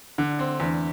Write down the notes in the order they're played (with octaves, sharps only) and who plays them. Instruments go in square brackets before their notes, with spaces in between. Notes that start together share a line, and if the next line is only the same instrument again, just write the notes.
[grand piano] D3 [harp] D4
[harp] E4
[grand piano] C4
[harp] A3 D4
[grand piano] E2 [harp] E3 A3